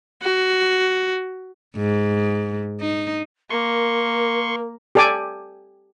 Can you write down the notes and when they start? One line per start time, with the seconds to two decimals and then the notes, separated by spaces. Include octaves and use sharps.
0.22 F#4
1.76 G#2
2.81 D#4
3.50 A#3 A#4 C6 C#6
4.95 G4 A4 D5 G#5 D6